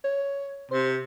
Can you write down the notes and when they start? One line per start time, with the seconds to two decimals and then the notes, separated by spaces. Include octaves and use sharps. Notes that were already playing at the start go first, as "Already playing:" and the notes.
0.04 C#5
0.71 C3 C5